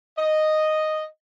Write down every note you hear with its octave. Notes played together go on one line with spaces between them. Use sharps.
D#5